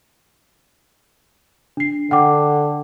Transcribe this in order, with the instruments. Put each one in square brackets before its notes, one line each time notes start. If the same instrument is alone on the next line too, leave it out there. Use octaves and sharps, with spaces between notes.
[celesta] D4 C7
[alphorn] D3 [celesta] F#5 G5 D6